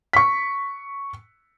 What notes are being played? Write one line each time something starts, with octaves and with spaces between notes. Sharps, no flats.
C#6 B6